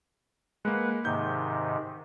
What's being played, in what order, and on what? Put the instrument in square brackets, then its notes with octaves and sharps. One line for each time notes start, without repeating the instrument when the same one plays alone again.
[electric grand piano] G#3 A#3 [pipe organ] B4 F#5
[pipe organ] G#2 C3 D#3 [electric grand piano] G6